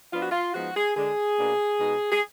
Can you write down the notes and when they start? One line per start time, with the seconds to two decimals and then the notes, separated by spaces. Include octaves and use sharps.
0.13 F3 B3 D4 F4
0.22 F#4
0.31 F4
0.54 F3 G#3 B3 D#4 F#4
0.76 G#4
0.96 D3 G#3 D4 G#4
1.37 B2 A#3 D4
1.80 B2 G#3 D#4
2.12 G#4